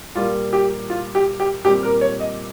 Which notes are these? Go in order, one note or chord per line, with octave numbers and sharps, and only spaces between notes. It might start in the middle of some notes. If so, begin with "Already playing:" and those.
A#2 G3 A#3 F4
G4
F4
G4
G4
A#2 G3 C4 G4
A#4
C#5
D#5